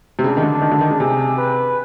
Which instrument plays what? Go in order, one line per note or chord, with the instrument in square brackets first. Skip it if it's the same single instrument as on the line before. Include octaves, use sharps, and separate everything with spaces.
[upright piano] C3
[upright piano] C#3 [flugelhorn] D4
[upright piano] D#3
D3
D#3
D3
D#3
C#3
[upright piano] C3 [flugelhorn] G#4
[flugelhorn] B4